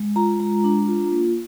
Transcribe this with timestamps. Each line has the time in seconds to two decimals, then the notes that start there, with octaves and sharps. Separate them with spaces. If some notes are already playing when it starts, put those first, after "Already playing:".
Already playing: G#3
0.16 F4 A#5
0.40 G#3 A#5
0.64 D4
0.88 F4
1.12 A#3